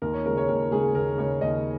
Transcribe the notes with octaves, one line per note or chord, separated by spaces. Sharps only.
D#2 A#4
C#5
C#3 G#3 A#4
C#5
D#2 A#4
C#3 G#3 G#4
D#2 A#4
C#3 G#3 C#5
D#2 D#5